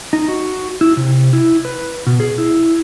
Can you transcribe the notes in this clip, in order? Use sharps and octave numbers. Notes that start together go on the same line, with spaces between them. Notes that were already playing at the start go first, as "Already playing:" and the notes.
D#4
F#4
E4
C3
E4
B4
B2
G#4
E4